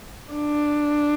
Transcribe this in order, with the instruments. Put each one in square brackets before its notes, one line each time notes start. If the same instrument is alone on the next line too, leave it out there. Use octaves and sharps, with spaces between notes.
[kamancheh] D4